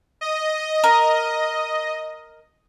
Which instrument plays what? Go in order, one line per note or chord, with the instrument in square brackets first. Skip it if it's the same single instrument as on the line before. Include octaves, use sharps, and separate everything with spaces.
[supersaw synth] D#5
[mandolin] A#4